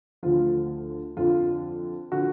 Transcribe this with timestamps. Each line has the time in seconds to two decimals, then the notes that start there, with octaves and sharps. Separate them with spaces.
0.23 D2 D3 F3 F4
1.17 F2 D3 F3 F4
2.12 D3 F3 F#4